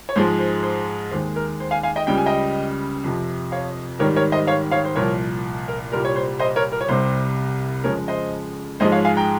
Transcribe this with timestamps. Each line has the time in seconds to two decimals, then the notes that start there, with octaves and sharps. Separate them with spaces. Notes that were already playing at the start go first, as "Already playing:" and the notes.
0.09 C#5
0.16 G#2 F3 G#3 C5
0.39 C5
0.63 C5
1.11 D#2 D#3 G#3 C5
1.36 A#4
1.60 C5
1.71 F5 G#5
1.83 F5 G#5
1.96 D#5 G5
2.07 C#2 C#3 G3 G5
2.17 G#5
2.26 D#5 G5
3.04 F2 C3 F3
3.52 C#5 F5
3.99 G#2 D#3 G3 A#4 C#5
4.16 A#4 C#5
4.32 C5 D#5
4.47 C#5 F5
4.71 C#5 F5
4.85 C5
4.96 C2 A#2 F3 A#4 C#5
5.68 A#4
5.92 C2 A#2 G3 A#4
6.05 C#5
6.16 C5
6.40 C5 D#5
6.56 A#4 C#5
6.72 A#4
6.81 C#5
6.89 C2 C3 G3 C5
7.84 F2 C#3 F3 G#3 A#4 C#5
8.08 C5 D#5
8.80 G#2 F3 G#3 C5 D#5
8.92 C#5 F5
9.05 F5 G#5
9.17 G5 A#5